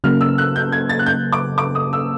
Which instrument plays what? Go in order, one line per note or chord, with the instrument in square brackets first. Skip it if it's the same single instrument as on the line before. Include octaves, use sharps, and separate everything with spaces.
[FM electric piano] C#3 F#3 A#3 [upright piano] F6
[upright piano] E6
F#6
G6
G#6
A6
F#6
G6
D6
D6
D#6
E6